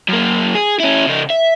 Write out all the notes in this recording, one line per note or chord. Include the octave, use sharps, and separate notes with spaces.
F#2 A#3
G#4
C#4 E4
C#3 D#4
E5